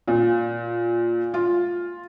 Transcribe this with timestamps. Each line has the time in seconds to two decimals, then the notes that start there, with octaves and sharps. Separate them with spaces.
0.08 A#2
1.34 F4